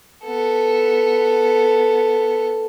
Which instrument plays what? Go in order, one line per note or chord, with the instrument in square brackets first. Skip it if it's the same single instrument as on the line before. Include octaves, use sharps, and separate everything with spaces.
[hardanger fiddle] B3 A4